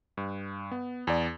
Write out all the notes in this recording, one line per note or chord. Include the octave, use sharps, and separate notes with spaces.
G2
B3
E2 D5